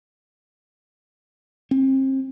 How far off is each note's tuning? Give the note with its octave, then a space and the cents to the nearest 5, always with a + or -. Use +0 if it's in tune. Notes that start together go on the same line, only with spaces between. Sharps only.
C4 +35